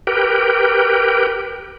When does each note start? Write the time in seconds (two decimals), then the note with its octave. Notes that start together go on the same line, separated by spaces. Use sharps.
0.07 G4 A#4 B4 G5